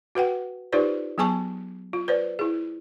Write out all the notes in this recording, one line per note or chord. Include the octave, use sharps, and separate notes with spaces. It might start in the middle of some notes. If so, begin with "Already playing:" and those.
F#4 B4 F#5 G5
D#4 F4 G4 B4 C5 D5
F#3 B3 G#4 G#5 A5 C#6
F4
B4 C5 D5
E4 G#4